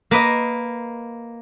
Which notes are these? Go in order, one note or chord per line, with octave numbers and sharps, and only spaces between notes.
A#3 B4 D#5